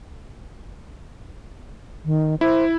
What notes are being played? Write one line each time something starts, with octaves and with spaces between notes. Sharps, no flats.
D#3
E4 C5